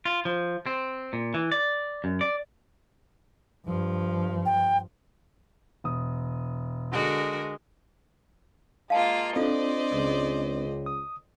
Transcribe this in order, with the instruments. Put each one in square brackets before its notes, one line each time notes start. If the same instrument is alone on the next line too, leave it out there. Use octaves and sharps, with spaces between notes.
[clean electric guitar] F4
F3
C4
A#2
E3
D5
F#2
D5
[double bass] G2 F3
[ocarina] G5
[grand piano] E1 D#6
[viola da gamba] D3 F#4 A#4 [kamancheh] G#3
[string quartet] G#3 A#3 F4 [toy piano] F5 A5
[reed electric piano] C4 D4 [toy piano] F4 A4 [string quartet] C5 D5 D#5
[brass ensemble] C#2 [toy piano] D#6
[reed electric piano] D#6